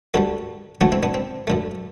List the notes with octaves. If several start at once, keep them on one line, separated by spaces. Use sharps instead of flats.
D2 D3 G3 F#4 A4
D2 D3 F#3 A3 D4 F#4
C4 E4
B3 D4
C4
F#2 D3 A3